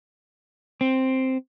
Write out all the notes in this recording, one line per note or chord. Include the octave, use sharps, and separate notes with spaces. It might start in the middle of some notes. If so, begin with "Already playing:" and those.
C4